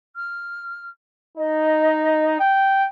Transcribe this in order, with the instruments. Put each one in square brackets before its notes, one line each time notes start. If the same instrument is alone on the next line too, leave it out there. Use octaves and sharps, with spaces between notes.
[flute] F6
[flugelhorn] D#4 [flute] D#5
[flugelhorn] G5